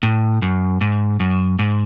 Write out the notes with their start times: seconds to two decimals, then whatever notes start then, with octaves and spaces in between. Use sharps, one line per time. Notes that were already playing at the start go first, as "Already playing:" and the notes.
0.03 A2
0.42 F#2
0.81 G#2
1.20 F#2
1.59 G#2